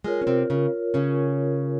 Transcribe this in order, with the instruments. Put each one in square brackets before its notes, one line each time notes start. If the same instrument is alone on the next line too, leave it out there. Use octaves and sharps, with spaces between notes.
[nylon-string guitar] G#3 [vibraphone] F4 A#4 C#5
[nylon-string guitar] C#4
C3 C4
C#3 C#4
C#3 C#4